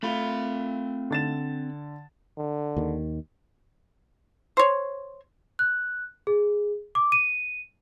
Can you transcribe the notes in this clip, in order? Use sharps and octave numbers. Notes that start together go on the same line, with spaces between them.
A3 C4 F4 B5
D3 A6 E7
D3
D#2 D#3
C5 C#5
F#6
G#4
D6
D#7